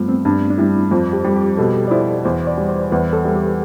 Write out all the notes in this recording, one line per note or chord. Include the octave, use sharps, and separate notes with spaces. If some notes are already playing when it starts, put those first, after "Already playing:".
Already playing: G2 F3 G3 A3 B3
C4
G2 D4
D4
G3 E4
F2 F4
G4
G3
G4
B2 A4
D5
E4 C5
E2 C5
D5
G3
C5
E2 B4
A4
G3
G4